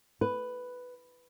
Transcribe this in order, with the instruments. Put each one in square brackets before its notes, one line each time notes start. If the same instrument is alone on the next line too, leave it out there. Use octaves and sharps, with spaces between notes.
[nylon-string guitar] B4